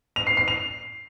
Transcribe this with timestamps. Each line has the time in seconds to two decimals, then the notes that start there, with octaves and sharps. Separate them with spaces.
0.16 F7
0.27 C7
0.37 C7
0.48 F7